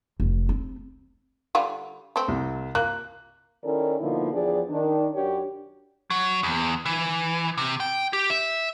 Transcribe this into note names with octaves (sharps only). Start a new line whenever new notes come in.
F1
C4
D3 G3 F4
A3 C4
C2
A#3 F#6
D#3 C#4 E4 A4 A#4 D5
B2 D3 F3 A#3 D#4 E4
E2 F3 D4 G4 G#4 D5
D#3 D4
F#2 D4 F#4 G4 C#5 D5
F#3
E2
E3
C3
G5
G4
E5